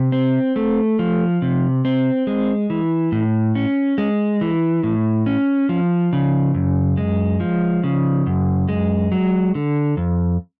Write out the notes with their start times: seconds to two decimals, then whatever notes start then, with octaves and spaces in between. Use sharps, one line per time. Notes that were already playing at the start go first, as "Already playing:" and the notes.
Already playing: C3
0.12 C4
0.56 A3
0.99 F3
1.42 C3
1.85 C4
2.27 G#3
2.70 E3
3.12 A2
3.55 C#4
3.98 G#3
4.41 E3
4.83 A2
5.26 C#4
5.69 F3
6.13 C#3
6.55 F#2
6.97 G#3
7.40 F3
7.84 C#3
8.27 F#2
8.69 G#3
9.12 F#3
9.55 D3
9.97 F2